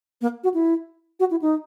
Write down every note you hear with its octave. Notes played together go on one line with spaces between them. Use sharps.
A#3
F#4
E4
F#4
E4
D#4